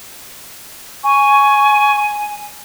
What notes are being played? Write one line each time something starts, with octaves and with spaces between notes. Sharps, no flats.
G#5 C#6